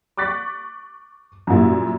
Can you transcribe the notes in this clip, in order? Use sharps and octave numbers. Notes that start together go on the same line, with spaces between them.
C#6 D6 F#6 A6 B6
F#2 A#2 F#3 G3 E4